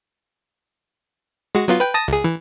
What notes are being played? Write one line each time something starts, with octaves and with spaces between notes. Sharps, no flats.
G#3 F#4
F#3 B3 F4
B4 G5
A5 D#6 A#6
C#2 G#4
E3